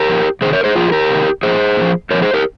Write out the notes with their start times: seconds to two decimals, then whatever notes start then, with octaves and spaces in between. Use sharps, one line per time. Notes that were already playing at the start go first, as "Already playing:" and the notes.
Already playing: G4 A#4
0.08 A#2 F3
0.41 C3 D#3 G#4 C5
0.53 A#4 C#5
0.64 G#4 C5
0.76 A#2 F3 F4 G#4
0.88 G#4
0.92 G4 A#4
1.10 C3 D#3
1.43 A#2 F3 G#4 C5
1.77 A#2 F3
2.11 A#2 F3 A#4 C#5
2.22 G#4 C5
2.34 G4 A#4